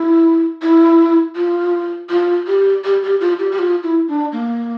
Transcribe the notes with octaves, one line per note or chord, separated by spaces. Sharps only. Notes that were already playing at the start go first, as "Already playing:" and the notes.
Already playing: E4
E4
F4
F4
G4
G4
G4
F4
G4
G4
F4
E4
D4
A#3